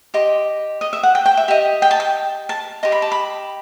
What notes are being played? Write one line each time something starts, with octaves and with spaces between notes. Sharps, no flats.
G4 D#5 C6
D#5
E5
F#5
G5
G5
E5
G4 D#5 E5
G5
A5
G5
A5
G4 D#5 C6
B5
A5
B5